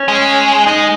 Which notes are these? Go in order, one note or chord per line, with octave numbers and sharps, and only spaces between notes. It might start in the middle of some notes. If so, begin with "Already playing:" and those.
Already playing: C#4
G#3
G#3 D#4